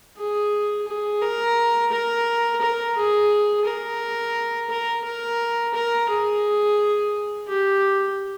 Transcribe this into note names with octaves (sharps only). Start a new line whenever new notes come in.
G#4
G#4
A#4
A#4
A#4
G#4
A#4
A#4
A#4
A#4
G#4
G4